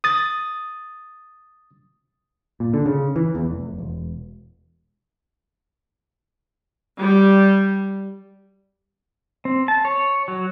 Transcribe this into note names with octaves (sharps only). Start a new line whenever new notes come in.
D#6 A6
A#2
D3
C#3
E3
E2
F1
E1
G3
C4
A5
C#5
F#3